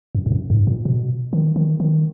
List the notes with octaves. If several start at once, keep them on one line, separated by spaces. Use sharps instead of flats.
F#2
G#2
F#2
G#2
A#2
B2
D#3
D#3
D#3